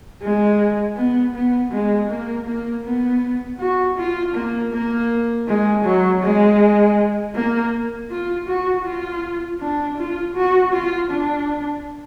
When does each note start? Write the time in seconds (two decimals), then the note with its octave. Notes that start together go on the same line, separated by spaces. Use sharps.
0.22 G#3
0.97 B3
1.35 B3
1.72 G#3
2.10 A#3
2.47 A#3
2.85 B3
3.60 F#4
3.97 F4
4.35 A#3
4.73 A#3
5.48 G#3
5.85 F#3
6.23 G#3
7.35 A#3
8.11 F4
8.49 F#4
8.85 F4
9.61 D4
9.98 F4
10.36 F#4
10.73 F4
11.11 D4